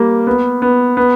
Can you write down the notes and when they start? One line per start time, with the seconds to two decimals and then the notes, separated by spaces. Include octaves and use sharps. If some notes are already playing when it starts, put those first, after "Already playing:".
Already playing: G3 A#3
0.27 B3
0.62 B3
0.97 B3